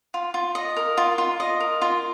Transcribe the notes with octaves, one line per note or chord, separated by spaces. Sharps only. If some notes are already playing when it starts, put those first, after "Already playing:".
F4
F4
D#5
A#4
F4
F4
D#5
A#4
F4